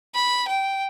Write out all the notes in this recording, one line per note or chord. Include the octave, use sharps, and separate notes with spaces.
B5
G5